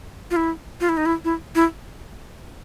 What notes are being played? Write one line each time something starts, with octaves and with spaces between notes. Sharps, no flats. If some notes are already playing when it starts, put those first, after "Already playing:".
F4
E4
F4
E4
D#4
E4
E4
E4